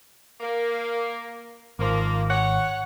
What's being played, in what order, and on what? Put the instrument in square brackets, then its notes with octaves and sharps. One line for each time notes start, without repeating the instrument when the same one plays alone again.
[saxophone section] A#3
[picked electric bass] G#1 [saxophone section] F3 A#3
[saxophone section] C#5 F#5